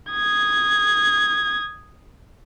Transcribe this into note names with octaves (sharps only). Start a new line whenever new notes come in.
D#6 G#6